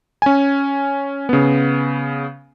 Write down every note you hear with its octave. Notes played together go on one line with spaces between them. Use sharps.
C#4 G#5
C#3 B3